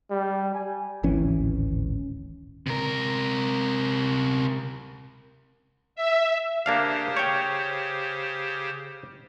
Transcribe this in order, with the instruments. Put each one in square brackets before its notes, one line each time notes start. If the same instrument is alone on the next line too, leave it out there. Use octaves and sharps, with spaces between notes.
[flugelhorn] G3
G#5
[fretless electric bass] D1 G#1 E3 C#4
[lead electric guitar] C3 A#4
[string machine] E5
[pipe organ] C#3 G4 C5 [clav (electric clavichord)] A#3 D4 F5
[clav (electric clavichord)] C#5 G5